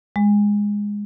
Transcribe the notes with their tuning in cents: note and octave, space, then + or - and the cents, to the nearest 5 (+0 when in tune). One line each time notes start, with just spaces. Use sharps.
G#3 -10